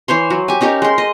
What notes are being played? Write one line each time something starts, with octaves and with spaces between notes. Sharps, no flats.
E3 C5 C#5 C6
F#3
G4 G#5
C#4 D#4 G4 A#4
G#3 C6
D#5